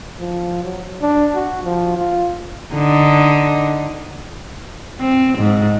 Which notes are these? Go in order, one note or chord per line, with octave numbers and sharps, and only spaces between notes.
F3
F#3
D4
F#4
F3
F4
D3 D#4
C4
G#2